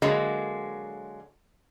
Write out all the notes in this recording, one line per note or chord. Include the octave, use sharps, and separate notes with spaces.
D3 F#3 G#3 A#3